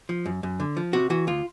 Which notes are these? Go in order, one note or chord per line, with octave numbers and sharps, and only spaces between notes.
F3
F#2
F#2
D3
F3
C3 F#4
E3 F#4
D2 F4